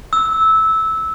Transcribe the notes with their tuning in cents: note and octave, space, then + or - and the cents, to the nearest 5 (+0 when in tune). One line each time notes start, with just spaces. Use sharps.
E6 -15